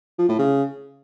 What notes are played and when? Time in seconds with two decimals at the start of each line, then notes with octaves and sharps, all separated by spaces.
0.19 F3
0.29 A2
0.39 C#3